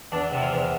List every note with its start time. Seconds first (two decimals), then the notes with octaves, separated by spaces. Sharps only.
0.12 E2 D4
0.32 C3
0.37 E4
0.42 F4
0.53 E2